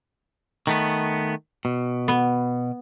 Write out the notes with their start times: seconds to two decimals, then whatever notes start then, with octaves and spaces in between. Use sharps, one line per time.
0.67 D#3 A3 B3
1.65 B2
2.08 B3